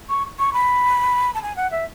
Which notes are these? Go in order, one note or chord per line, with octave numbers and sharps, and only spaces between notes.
C#6
C#6
B5
A5
G#5
F#5
E5